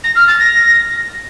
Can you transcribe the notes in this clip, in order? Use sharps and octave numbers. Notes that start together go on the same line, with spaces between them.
A#6
F6
A6
A#6